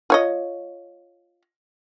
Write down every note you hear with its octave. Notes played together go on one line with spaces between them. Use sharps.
F4 C#5 D#5